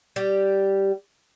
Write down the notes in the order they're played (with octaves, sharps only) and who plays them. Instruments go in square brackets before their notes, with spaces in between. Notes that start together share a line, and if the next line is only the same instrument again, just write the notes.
[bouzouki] G3 G4